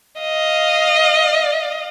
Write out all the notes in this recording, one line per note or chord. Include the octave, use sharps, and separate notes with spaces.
D#5 F5